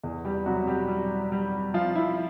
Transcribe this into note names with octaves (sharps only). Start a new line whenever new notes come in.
E2
G3 G4
C3 F#3 F#4
G3 G4
G3
G3
F3 F4
E4